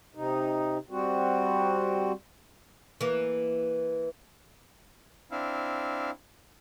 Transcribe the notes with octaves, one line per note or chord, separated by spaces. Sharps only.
C3 D#4
G3 C4 F#4
E3 A#3
C4 D4 E4 F5